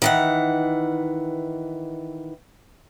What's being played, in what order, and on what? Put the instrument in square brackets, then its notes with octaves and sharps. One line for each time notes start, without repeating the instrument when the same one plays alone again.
[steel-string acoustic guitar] D#3 E3 F#5